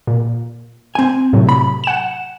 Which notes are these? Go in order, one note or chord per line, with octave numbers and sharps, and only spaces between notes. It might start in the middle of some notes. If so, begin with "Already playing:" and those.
A#2
C4 G#5
A2 C3 F#3
B5
F#5 E7